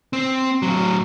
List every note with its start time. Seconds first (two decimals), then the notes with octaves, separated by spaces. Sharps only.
0.13 C4
0.62 A2 F#3